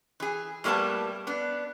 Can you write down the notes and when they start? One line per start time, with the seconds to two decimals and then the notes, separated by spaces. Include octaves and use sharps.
0.20 E3 G#4
0.64 A2 G3 A#3 B3 A5
1.27 B3 D4